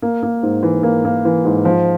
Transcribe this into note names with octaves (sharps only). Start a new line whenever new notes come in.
A#3
A#3
G#2
E3
A#3
A#3
E3
G#2
F3